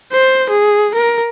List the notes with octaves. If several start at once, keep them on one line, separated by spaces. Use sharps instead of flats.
C5
G#4
A#4